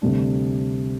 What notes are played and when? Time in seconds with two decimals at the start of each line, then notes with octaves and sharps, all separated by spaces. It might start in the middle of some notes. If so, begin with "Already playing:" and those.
0.02 D2 C3 G3 D4